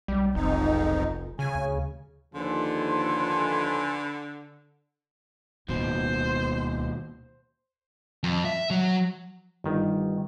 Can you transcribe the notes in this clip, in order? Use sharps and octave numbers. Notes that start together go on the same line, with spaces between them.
B1 G3
F1 F2 G#2 D#4
C#3 G#5
D2
D#2 D3 F3 A4 B4 G#5 C6
D1 D#2 B2 C5
F2
E5
F#3
G1 D#3